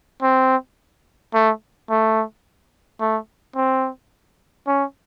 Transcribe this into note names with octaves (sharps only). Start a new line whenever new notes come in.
C4
A3
A3
A3
C4
C#4